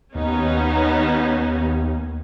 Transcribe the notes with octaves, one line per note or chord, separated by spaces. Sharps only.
D#2 B3 C#4 D#4